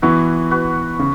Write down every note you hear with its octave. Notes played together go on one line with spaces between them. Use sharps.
E3 B3 E4 F#4
F#4 B4
C#3